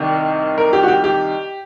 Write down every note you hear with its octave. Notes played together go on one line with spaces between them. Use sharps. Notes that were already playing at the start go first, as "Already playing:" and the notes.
Already playing: C2 C3 D#3
A#4
G4
F#4
G4
G4